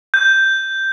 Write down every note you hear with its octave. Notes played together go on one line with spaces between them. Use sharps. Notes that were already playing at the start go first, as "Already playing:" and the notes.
G6